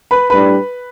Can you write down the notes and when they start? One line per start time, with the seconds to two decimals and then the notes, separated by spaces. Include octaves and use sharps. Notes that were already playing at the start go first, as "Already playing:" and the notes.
0.11 B4 B5
0.30 A2 G3 D4 B4 B5